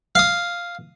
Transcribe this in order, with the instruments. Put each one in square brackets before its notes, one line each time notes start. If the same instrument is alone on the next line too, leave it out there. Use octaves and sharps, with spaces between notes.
[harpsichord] F5 D#6